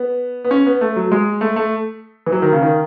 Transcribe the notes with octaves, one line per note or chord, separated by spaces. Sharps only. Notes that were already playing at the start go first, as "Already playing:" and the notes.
Already playing: B3
B3
C#4
B3
A3
F#3
G#3
A3
A3
E3
F#3
D#3
C#3
D#3